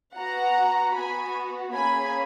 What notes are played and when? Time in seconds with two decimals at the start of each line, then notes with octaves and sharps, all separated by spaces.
0.17 B3 F#4 F#5 A#5
0.95 B3 F#4 G#5 B5
1.74 A#3 C#4 G#4 G#5 B5